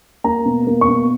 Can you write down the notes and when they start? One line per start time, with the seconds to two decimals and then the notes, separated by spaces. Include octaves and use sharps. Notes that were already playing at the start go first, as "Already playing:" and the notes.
0.24 A#3 A#5
0.46 B2
0.67 A#3
0.81 C#6
0.88 B2